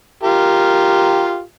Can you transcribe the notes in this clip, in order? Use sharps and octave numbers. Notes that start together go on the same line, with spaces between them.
F4 G4 A#4